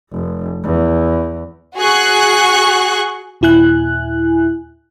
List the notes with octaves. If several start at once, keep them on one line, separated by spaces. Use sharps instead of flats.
F1
E2
F#4 G#4 C#6 F#6
D#2 A#2 E4 G#5 F#6